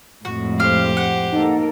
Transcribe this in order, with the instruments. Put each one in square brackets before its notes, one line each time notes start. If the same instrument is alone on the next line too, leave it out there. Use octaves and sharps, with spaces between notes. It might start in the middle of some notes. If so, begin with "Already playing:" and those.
[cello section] F2 A2 G#3 [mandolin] F#4
[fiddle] G4 C5 [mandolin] F5
[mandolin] F#5
[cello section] A#3 A4 A#4 [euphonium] D#4